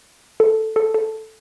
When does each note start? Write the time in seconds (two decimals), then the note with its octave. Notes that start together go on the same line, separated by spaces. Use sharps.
0.40 A4
0.76 A4
0.94 A4